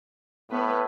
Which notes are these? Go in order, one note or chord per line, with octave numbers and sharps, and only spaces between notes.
A2 B3 B4